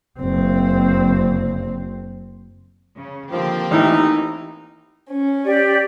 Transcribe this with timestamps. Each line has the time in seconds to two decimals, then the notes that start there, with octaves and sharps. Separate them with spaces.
0.20 F#1 C4
2.96 C#3
3.31 D3 D#3 F3 A#3 C4 G4
3.71 A1 E3 D#4 E4
5.09 C#4
5.45 G4 D5